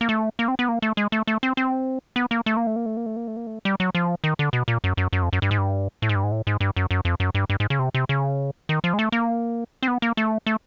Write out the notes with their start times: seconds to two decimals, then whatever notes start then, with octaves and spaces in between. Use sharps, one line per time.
0.01 A#3
0.09 A3
0.39 A#3
0.48 C4
0.59 B3
0.69 A#3
0.82 A3
0.97 G#3
1.12 A3
1.27 A3
1.43 C4
1.57 C4
2.16 B3
2.31 A#3
2.46 A3
2.57 A#3
2.67 A3
2.76 A#3
2.86 A3
2.97 A#3
3.06 A3
3.16 A#3
3.28 A3
3.37 A#3
3.47 A3
3.65 G3
3.80 F#3
3.95 F3
4.24 D#3
4.39 D3
4.53 B2
4.68 A#2
4.84 F#2
4.97 F#2
5.13 F#2
5.23 F2
5.33 F#2
5.42 G2
5.51 G#2
5.58 G2
6.02 A2
6.09 G#2
6.15 G2
6.24 G#2
6.32 A2
6.47 G#2
6.60 G2
6.76 F#2
6.91 F#2
7.05 F2
7.20 F#2
7.35 G2
7.50 G2
7.60 G#2
7.70 C#3
7.79 C3
7.94 C3
8.09 C#3
8.69 D#3
8.84 F3
8.94 G#3
8.99 A3
9.12 A#3
9.83 C4
9.88 B3
10.02 A#3
10.17 A3
10.46 A3